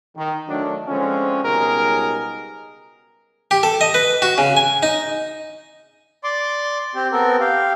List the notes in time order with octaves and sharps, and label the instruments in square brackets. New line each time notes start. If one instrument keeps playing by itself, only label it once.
[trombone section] D#3
D#3 F#3 A3 D4
D3 F3 G#3 C4 C#4
C#2 B2 G3 D#4 G#4 A#4
[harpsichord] G4
A4
D#5
B4
F#4
C#3
G#5
D#4
[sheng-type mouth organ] D5 C6 D6
C4 G4
B3 C4 A4 A#4
G4 F5